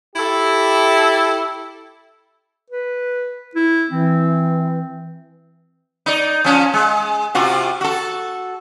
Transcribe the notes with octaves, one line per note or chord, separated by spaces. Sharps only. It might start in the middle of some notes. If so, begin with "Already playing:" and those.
E4 G4 A4 E5
B4
E4
E3 C4
D#4 D5
F3 C#4
G#3
C3 F4 F#4
F#4 A4